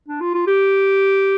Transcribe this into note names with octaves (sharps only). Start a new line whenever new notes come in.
D4
F4
F4
G4